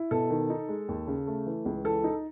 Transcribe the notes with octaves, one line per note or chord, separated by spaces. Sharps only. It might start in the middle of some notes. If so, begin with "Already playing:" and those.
Already playing: E4
B2 A4
D#3
D#4
G#3
D#2
C#3
A3
E3
C#2
E3 A4
D#4